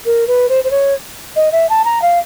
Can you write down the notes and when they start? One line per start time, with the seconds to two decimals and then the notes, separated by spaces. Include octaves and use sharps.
0.05 A#4
0.27 B4
0.49 C5
0.64 C5
0.71 C#5
1.36 D#5
1.52 E5
1.69 A5
1.85 A#5
2.02 F5